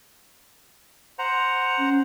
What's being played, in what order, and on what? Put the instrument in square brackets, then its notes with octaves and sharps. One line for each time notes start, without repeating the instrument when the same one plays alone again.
[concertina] C5 F#5 A#5
[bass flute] C#4